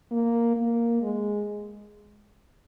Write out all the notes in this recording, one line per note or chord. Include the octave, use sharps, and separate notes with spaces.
A#3
A#3
G#3